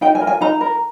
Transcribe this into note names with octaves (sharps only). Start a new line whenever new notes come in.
D#4 G5
G#5
A#4
G#5
D#4 A#5
A#4